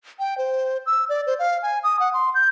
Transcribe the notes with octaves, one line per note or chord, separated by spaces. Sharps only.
G5
C5
E6
D5
C5
F5
G#5
D#6
F#5
C6
G6